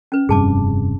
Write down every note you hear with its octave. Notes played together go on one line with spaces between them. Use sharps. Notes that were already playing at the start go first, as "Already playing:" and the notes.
C#4 B4
F1 G2 C3 G#4 A5 D6